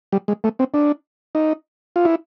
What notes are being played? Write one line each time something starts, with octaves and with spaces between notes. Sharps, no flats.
G3
G#3
A3
C4
D4
D#4
F4
E4